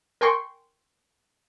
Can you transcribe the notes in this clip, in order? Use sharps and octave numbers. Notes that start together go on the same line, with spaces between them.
A#4 G5 G#5 C6 C#6